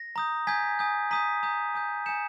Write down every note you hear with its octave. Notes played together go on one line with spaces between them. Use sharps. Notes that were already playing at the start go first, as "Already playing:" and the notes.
Already playing: A#6
A#5 D#6 G6
G#5 D#6 G6 G#6 B6
G#5 D#6 G6
A#5 D#6 G6 B6 D#7
A#5 D#6 G6
G#5 D#6 G6
G#5 D#6 G6 C#7 E7